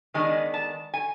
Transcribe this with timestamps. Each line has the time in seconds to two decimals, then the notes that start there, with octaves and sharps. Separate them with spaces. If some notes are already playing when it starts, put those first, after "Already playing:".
0.14 D#3 G#3 B3 D4 G#5
0.54 A5
0.94 G#5